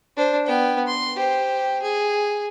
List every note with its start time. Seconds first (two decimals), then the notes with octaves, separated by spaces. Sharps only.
0.17 D4 C5
0.47 B3 G5
0.87 C6
1.16 G4 C5
1.82 G#4